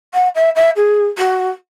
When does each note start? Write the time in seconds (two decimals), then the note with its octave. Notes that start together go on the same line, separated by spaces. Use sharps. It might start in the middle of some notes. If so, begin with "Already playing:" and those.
0.14 F#5
0.35 E5
0.55 E5
0.76 G#4
1.18 F#4